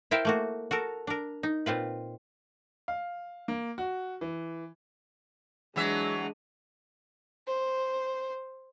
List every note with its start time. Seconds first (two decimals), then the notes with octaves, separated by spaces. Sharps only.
0.11 E4 A#4 C5 E5 F5 G5
0.25 A3 A#3 F#4
0.71 F#4 A4 A#4
1.07 D4 A#4
1.43 D#4
1.66 A#2 C4 F4 B4
2.88 F5
3.48 A#3
3.78 F#4
4.21 E3
5.76 E3 F#3 G#3 D4 E5
7.47 C5